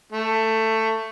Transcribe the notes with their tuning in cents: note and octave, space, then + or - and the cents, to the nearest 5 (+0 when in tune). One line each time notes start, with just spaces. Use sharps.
A3 +15